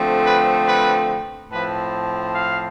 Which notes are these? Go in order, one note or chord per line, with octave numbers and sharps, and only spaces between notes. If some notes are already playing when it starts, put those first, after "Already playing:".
Already playing: D3 F3 A3 C4
B4
B4
A2 F3 C4 B4
F5